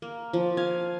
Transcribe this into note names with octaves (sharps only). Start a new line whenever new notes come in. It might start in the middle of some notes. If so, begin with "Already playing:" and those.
A#3
F3
F5 G#5